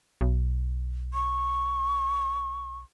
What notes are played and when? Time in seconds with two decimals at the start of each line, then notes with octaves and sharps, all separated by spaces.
0.21 B1
1.14 C#6